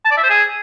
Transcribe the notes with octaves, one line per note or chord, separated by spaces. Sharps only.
A5
D5
E5
C5
G#4